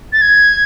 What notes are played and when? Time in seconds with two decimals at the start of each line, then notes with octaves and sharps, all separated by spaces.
0.13 A6
0.22 G#6